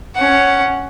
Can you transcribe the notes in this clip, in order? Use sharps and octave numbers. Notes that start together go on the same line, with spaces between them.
C#4 F#5